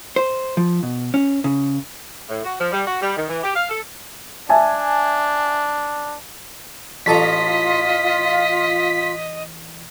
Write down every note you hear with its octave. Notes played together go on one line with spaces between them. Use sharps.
C5
F3
B2
C#4
C#3
A2
F#4
F3
G3
F#4
G3
D#3
E3
G4
F5
A4
D4 E5 G#5 A5
A1 F4 A4 D#5 A#5 B6